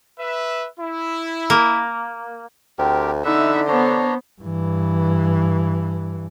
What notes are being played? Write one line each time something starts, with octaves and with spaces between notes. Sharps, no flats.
B4 E5
E4
A#3
D2 C4 G4 A#4
D3 D#4 E4 E5 F#5
B3 D4 C5 C#5 A#5
G2 E3